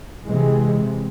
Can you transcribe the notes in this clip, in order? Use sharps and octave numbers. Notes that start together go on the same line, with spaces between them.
C3 E3 G#3